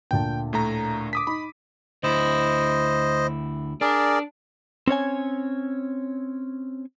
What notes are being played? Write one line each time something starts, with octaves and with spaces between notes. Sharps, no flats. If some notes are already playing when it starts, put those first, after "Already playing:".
D2 A#2 G5 A5
A2 A3 A#5
D6 D#6 B6
D#4 B5
D2 E4 C5 D#5
D4 G#4 A#4 D5
C4 C#4 C#5 G#5